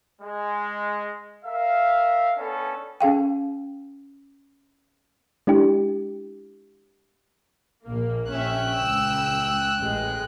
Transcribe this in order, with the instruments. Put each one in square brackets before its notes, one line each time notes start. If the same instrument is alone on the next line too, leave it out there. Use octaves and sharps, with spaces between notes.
[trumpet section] G#3
A#4 E5 F5
B3 C#4 D4 A4
[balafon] C#4 G#4 F5 G5
[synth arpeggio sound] G#3 D4 E4 G4
[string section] A#1 A#3
[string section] A#1 C#4 E5 [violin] G5 F#6
[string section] C#2 E6
A1 G#3